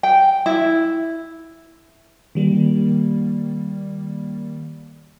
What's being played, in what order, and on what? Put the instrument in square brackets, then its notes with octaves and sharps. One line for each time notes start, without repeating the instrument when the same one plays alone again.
[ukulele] G5
E4
[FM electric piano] D#3 G3 A#3